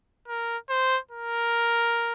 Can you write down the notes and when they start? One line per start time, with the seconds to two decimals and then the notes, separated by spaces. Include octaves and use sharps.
0.28 A#4
0.69 C5
1.11 A#4